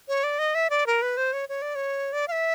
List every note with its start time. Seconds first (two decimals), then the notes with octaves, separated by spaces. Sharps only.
0.08 C#5
0.24 D5
0.39 D#5
0.55 E5
0.70 D5
0.86 A#4
1.02 B4
1.17 C5
1.33 C#5
1.49 C#5
1.62 D5
1.75 C#5
2.13 D5
2.28 F5
2.32 E5